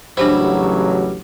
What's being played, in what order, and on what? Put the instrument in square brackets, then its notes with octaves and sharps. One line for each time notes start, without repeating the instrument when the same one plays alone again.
[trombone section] A1 C#3 F#3 [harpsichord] G3 E4 [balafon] D4 G4 C5